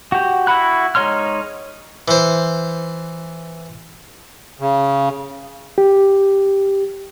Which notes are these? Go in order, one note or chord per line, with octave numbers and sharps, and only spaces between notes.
F#4 G4
E4 F#4 F#5 B5 F#6
G#3 D#4 C#5 C6 F6
E3 C5
C#3
G4